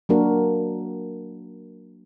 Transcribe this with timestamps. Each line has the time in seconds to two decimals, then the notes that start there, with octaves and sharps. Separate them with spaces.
0.09 F#3 A#3 D4 F#4 A#4